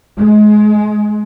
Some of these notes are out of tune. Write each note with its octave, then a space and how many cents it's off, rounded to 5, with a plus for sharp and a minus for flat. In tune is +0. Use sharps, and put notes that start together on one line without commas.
G#3 +25